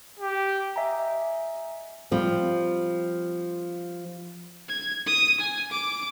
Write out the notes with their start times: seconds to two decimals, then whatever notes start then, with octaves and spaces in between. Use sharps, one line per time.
0.19 G4
0.76 D#5 E5 G#5 A#5
2.11 F3 G3 C4
4.68 G#6
5.06 D#6
5.40 G#5
5.72 D6